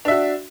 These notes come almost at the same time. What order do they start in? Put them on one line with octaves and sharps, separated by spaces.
D4 E5 F#4